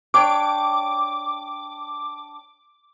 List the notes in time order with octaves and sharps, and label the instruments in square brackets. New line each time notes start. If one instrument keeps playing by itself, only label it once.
[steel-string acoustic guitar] D4 C#5 G5 [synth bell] D6